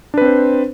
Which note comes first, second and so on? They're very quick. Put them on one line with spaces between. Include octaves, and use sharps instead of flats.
D4 B4 C4 C5